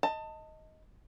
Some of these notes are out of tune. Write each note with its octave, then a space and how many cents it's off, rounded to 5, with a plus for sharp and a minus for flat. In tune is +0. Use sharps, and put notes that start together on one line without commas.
D#5 +10 A5 +25